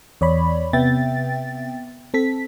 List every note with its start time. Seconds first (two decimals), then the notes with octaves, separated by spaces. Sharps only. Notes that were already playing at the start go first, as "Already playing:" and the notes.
0.21 E2 C#5 D5 B5
0.73 C3 B3 E5 G5 A6
2.14 C4 A4 B6